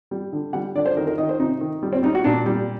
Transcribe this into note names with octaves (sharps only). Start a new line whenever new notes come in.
G3
D3
G3 F#5
D3 D5
C5
D#3 A#4
A#4
D#3 D#5
C5
C3 D#4
D#3
G3
C4
G3 D#4
F#4
A#2 D4
G3